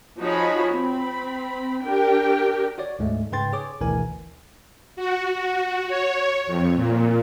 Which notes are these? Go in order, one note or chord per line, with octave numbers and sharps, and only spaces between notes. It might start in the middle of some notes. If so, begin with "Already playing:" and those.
F3 D#4 F#4 G#4 C#5 B5
C4 B5
D4 G4 A#4 G5
F#4 C#5 D5
D2 G#2 G#3 A3
G#2 C#3 B4 G5 C6 A6
G#4 C#5 D6
G#1 D2 B2 E3 A#4 G#5
F#4
F#4
C#5
F2
A#2